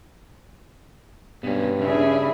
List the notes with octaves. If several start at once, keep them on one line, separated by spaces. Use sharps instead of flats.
G2 B2 C#4
C#3 C#4 D4 E4 G#4 E5